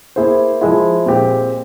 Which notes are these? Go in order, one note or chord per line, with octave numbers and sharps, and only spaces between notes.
A#3 E4 G#4 C5
F3 G#3 E4
A#2 G#3 C4 G4